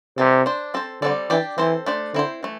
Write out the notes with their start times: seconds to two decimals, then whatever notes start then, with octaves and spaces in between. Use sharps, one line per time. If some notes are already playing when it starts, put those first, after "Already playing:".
0.18 C3 E3 G3 C4 A4
0.46 D4 C5
0.74 C4 A4 C5
1.02 D3 G3 C4 E4 A4 D5
1.30 E3 D4 G4 D5
1.58 E3 C4 A4 C5
1.86 A3 D4 C5
2.14 D3 C4 E4 C5
2.43 E3 A3